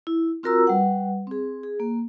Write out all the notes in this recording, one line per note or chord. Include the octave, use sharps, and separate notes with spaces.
E4
C4 F4 F#4 A#4 A#5 E6
G3 B4 F#5
C4 G#4
G#4
A#3